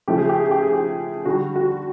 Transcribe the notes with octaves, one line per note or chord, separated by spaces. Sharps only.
C#3 F3 A3 G4
G#4
G4
G#4
G4
G#4
G4
D3 G3 F#4
F#4